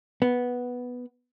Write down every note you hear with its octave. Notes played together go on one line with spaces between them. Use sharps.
B3